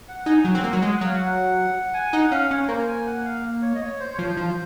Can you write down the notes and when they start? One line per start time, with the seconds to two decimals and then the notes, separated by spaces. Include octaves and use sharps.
0.08 F#5
0.26 D#4 G#5
0.45 F#3 F#5
0.55 C4
0.64 A#3
0.73 F#3
0.82 G#3 G#5
0.94 F#5
1.01 F#3 F5
1.16 F#5
1.94 G#5
2.13 D#4 F#5
2.31 C#4 F5
2.51 C#4 C#5
2.69 A#3 C5
2.88 G#5
3.06 F#5
3.25 F5
3.62 C#5
3.75 D#5
3.81 C#5
4.00 C5
4.14 C#5
4.18 F3 C5
4.37 F3